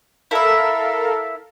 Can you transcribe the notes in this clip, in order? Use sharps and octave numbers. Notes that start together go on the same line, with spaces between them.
E4 A4 A#4 E5 F5